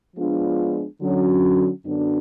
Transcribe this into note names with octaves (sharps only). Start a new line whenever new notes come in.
F3 G#3 B3 D4 F4
D3 F#3 C#4
F#2 D3 F#3 B3 D4